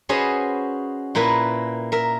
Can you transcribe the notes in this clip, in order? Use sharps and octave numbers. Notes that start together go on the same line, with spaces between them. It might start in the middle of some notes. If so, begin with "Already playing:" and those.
C#4 F#4 G#4 B4 C5 D#5
A#2 A#3 E4 B4
A#4 E5